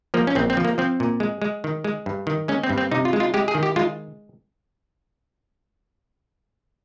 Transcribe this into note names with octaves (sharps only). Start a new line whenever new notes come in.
F3 A#3
C#4
A#1 C4
C4
F3
A#3
F3 C4
A#2
G#3
G#3
D#3
G#3
G2
D#3
G#3 C#4
C4
G2
C4
C3 D#4
F4
G#3
F4
G#3 G4
G#4
D#3
G4
G#3 F4